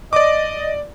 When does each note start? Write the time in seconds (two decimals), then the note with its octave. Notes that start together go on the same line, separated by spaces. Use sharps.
0.13 D5 D#5 D6